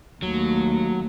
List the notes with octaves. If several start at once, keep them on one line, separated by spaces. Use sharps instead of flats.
D#2 F#3 A3